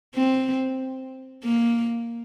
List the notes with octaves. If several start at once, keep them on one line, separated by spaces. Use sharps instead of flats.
C4
A#3